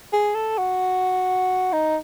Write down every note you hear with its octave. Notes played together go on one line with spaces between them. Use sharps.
G#4
A4
F#4
D#4